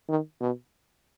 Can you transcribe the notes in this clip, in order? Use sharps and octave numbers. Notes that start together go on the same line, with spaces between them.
D#3
B2